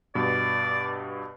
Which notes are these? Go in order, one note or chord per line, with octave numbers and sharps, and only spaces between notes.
G2 B2 D5